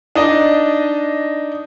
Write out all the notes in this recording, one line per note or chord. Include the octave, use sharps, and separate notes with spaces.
D4 D#4 D#5